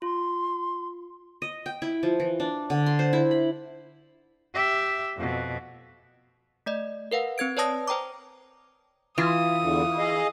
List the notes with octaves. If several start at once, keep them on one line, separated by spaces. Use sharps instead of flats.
F4 C6
D#5
G5
E4
F3
E3
D4
D3
C6
C5
E4
B5
G4 E5
F2 B2
A3 D5 D#5
A#4 B4 F5 F#5
C4 B4 G#6 D7
B4 C#5 D5 A5 D#6 A#6
C5 G5 A#5 D6
E3 F4 D#6
E2 D3
G#4 D#5 F5